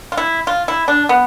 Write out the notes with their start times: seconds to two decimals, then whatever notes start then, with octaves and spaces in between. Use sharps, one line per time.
0.12 F4
0.17 E4
0.47 F4
0.68 E4
0.88 D4
1.09 B3